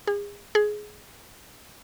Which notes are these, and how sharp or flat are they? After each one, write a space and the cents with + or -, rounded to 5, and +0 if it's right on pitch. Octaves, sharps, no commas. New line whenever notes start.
G#4 -35
G#4 +15